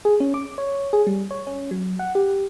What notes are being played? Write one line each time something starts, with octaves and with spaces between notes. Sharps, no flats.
G#4
C#4
D6
C#5
G#4
G3
C#5
C#4
F#3
F#5
G4